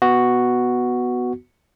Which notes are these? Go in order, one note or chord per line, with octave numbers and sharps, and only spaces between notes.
B3 F#4